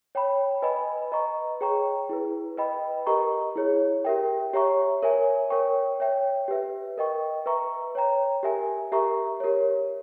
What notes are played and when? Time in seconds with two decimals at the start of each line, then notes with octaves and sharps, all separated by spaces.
0.15 C#5 G5 B5
0.62 B4 D#5 G#5 B5
1.12 B4 D#5 A#5 C#6
1.61 G#4 C#5 G5 A#5 C#6
2.09 E4 G#4 B4
2.57 B4 D#5 G5 B5
3.06 G4 A#4 D#5 A#5 C#6
3.56 E4 G#4 C#5
4.05 G4 A#4 E5 G5
4.53 G4 C#5 E5 A#5 C#6
5.02 A#4 C#5 E5 G#5
5.50 A#4 C#5 G5 C#6
6.00 C#5 E5 G5
6.48 G4 B4 E5
6.98 A#4 D#5 G5 C#6
7.46 B4 E5 A#5 C#6
7.95 C#5 G5 A#5
8.43 G4 A#4 E5 G#5
8.92 G4 A#4 E5 A#5 C#6
9.40 G4 A#4 C#5